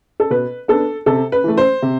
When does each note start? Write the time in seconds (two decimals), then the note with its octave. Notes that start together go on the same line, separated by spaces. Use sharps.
0.20 A4
0.30 B2 B4
0.68 B3 D4 A4
1.06 C3 A4
1.32 B4
1.44 E3 A3
1.58 C5
1.82 C3